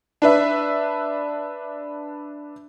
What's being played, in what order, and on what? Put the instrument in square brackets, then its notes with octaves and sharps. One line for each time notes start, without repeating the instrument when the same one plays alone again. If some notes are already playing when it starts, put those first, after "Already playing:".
[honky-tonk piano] D4 B4 E5